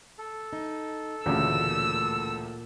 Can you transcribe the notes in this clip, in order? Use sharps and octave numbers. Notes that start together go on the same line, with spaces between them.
A4
D#4
A1 D2 A#2 C#3 E6